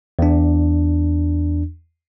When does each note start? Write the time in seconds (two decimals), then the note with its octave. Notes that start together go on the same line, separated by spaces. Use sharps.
0.19 E2 D4